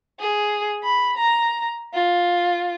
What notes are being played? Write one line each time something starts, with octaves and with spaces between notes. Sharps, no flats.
G#4
B5
A#5
F4